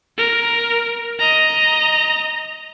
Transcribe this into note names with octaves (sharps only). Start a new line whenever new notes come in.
A#4
D#5 A#5